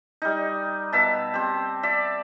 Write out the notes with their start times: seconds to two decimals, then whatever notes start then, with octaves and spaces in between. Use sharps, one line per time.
0.22 G3 D#4
0.92 B2 E5 A5
1.34 C4 G4
1.83 D5 E5